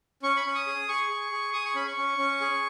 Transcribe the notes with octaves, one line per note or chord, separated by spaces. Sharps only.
C#4 C#6
B5
C#4 C#6
D#6
G#4
G#4 C#6
G#4
G#4
G#4 D#6
C#6
C#4 B5
C#6
C#4
C#4
G#4